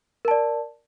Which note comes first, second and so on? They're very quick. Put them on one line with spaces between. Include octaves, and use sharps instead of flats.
A#4 A5 D5